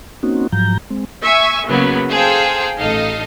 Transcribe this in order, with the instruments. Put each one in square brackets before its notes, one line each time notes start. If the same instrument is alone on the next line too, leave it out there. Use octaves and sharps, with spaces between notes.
[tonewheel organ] A#3 C4 C#4 D#4 F#4
G#2 F3 F#3 A#5 G6
G#3 C4
[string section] E5 G#5 C#6
C#3 F#3 A#3 B3
G#4 A4 C5 F5 G5
A1 D#4 A4 D#5 F5